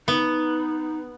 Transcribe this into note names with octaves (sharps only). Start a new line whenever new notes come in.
B3 D#4